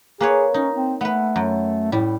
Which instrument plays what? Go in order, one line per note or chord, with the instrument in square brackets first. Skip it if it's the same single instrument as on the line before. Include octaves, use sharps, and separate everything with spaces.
[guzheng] A#3 B4 C#5 [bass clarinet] G#4
[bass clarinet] C#4 [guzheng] D#4
[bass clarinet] C4
[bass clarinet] A3 [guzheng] B3 B4
[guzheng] F#2
[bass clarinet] A2 [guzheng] G3